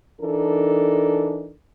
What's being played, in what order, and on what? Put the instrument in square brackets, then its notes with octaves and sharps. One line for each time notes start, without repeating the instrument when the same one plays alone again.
[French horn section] E3 D4 D#4 A4 A#4